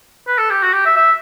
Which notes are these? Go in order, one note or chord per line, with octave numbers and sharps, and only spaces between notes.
B4
A4
G4
F#4
G4
E5
E5